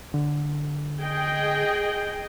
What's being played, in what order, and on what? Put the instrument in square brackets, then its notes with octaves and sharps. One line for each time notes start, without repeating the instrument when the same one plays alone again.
[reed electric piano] D3
[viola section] G#4 D#5 G5